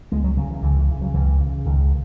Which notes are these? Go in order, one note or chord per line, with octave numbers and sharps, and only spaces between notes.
C#2 G#3
F#3
C#3 F#3
E3
C#2 E3
E3
C#3 E3
F#3
C#2 E3
C#3
C#2 D#3